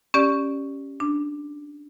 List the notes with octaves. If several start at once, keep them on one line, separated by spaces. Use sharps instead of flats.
C#4 G4 D5
D4